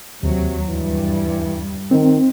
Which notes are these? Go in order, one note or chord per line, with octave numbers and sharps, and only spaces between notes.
D#2 C3 F#3
G2 E3 G3
D#3 C4